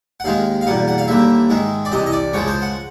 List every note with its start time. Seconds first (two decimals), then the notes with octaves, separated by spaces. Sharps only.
0.20 F#5
0.24 D#2 D#3 G#3 F5
0.61 F5
0.67 E2 B2 G3 A#3 F#5
0.88 F#5
0.98 F5
1.08 D#2 D3 G3 A#3 E5
1.49 G#2 D#3 G#3
1.85 D5
1.92 C2 C3 E3 D#5
2.06 D#5
2.12 D5
2.33 C#2 C#3 F3 G#3 C#5
2.48 C5
2.62 F#5